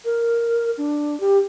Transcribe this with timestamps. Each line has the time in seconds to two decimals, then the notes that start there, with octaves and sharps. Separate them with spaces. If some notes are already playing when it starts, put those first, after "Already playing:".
0.05 A#4
0.78 D4
1.20 G4